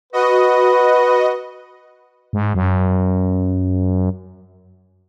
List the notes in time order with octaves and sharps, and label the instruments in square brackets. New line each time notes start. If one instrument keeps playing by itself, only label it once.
[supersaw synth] F#4 D#5 [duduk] B4
[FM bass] G#2
F#2